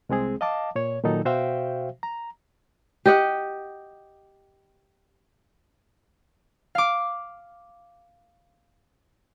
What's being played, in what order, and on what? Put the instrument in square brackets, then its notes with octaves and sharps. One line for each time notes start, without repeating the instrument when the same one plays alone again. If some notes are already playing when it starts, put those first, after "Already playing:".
[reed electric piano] C2 G#3 C4 G#4
D#5 F5 A5 D6
A#2 C#5
A#2 D#3 F#3 D#4 A4
B2 F#4 C5 E5 F5 G5
A#5
[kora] G4 D#5 F#5
[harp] F5 D6